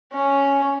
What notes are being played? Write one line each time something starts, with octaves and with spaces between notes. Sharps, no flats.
C#4